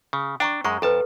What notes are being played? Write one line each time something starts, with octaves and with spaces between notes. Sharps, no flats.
C#3
D4 G5 A#5 C#6
F#2 G#3 A#5 C#6
F2 A4 B4 A5